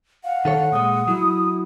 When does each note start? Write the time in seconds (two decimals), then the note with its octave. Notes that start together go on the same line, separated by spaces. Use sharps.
0.24 F5 F#5
0.45 D#3 A4 C#5
0.72 A#2 G#3 D#6
1.08 F#3 E4